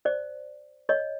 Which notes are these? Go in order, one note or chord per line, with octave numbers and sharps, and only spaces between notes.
C5 D5
C#5 D#5